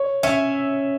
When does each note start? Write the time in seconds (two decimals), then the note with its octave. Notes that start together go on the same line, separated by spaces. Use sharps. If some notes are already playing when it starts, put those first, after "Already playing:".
Already playing: C#5
0.23 C#4 E5